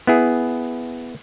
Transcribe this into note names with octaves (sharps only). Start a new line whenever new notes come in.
B3 E4 G#4